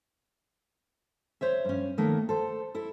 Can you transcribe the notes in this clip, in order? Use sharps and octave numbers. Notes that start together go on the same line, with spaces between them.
C5 C#5 E5
G2 C#4
D#3 A3 A#3
A4 C5
E4 A4